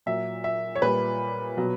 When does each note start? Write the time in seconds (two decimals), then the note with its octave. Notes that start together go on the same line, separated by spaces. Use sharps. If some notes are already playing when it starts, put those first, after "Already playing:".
0.06 A#2 F#3 E5
0.44 E5
0.76 C#5
0.82 A#2 G3 B4
1.57 B2 F#3